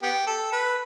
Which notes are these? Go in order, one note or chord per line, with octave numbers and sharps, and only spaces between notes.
B3 G4
A4
B4